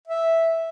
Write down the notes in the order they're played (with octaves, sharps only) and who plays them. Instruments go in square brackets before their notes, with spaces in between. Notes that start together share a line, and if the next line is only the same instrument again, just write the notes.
[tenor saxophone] E5